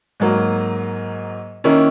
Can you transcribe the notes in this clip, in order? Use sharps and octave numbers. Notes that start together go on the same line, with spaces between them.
G#2 F#3 A#3
D#3 A#3 C#4 E4